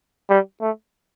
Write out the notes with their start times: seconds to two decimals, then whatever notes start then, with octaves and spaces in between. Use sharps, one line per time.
0.29 G3
0.61 A3